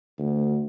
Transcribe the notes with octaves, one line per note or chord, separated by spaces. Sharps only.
D2